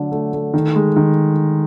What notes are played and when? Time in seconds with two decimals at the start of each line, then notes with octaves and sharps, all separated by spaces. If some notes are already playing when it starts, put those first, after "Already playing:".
Already playing: D3 F#3 A3 D4
0.12 A3
0.33 A3
0.54 D#3
0.75 G#3
0.96 D#3